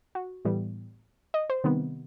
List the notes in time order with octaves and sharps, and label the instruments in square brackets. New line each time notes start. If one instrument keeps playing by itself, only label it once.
[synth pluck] F#4
A2 E3 G3 B3
D#5
C5
C3 D#3 G3 B3